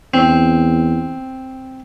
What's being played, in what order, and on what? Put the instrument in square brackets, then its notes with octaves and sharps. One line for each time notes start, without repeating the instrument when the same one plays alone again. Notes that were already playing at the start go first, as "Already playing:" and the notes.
[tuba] E2 [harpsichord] C4